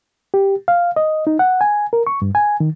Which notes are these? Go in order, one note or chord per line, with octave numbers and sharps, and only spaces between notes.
G4
F5
D#5
D#4
F#5
G#5
A#4
C#6
G2
G#5
D#3